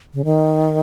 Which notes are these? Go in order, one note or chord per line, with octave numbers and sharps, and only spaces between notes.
C#3
D#3